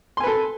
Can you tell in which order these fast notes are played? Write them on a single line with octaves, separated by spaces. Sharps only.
C6 G#5 B4 A4